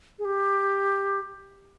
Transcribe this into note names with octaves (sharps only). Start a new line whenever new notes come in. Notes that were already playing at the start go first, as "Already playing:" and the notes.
G#4
G4